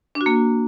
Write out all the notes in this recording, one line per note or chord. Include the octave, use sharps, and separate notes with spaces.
D4
F#4
A#3